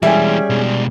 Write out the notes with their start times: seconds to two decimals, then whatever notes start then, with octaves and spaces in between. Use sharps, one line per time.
0.03 E3 G3 G#3 C#4 G#4 E5 G5 G#5
0.50 B2 G#3